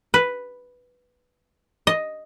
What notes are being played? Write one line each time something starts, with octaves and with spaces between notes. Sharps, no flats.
B4
D#5